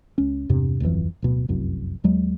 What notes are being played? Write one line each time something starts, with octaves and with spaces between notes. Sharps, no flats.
C#2 C#4
E2 G2 C3
D1 G1 F2 E3
D1 B2
F1 C2 F#2
D#2 F#3 G#3